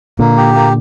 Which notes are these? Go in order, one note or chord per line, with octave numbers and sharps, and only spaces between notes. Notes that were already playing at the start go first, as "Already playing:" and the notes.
A#2 D3 A#3
G4
A#3